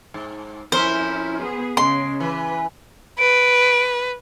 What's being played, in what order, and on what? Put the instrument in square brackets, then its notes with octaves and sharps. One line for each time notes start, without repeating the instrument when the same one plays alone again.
[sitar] G#2
[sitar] F2 C#4 A#4 [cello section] E4 [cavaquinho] C5
[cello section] B3 G#4
[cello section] C#3 [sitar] G#3 [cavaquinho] C6
[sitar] E3 [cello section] B4
[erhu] B4 [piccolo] D7